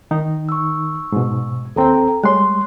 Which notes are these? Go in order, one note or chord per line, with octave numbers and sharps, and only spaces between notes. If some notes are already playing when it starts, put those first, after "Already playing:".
D#3 D#4
C#6 E6
G#2 B2
D#2 C4 A4 G5 A#5
G3 G#3 C#5 C6 F#6